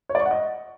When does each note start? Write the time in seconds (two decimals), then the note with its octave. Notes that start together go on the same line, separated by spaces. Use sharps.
0.09 C#5
0.15 D5
0.20 C#6
0.26 F#5
0.31 D#5